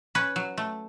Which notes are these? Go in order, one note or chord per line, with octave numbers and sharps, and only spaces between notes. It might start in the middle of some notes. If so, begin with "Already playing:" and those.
C#4 B4
F#3
A3